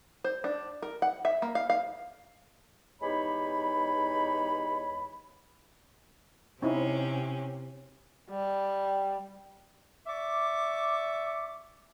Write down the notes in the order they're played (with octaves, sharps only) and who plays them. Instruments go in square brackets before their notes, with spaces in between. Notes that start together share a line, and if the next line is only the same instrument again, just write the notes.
[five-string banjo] C5
D4
A#4
F#5
E5
A#3
F5
F5
[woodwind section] E2 G#3 D#4 G4 C#5 B5
[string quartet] C3 C#4 [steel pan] C4 D#4 E4
[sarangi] G3
[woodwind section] D5 E5 C#6 D6